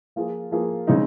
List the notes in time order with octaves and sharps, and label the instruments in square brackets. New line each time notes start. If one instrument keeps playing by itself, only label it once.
[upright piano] F3 A#3 F4 G#4
F3 A#3 F4 G#4
C#3 G#3 C4 D#4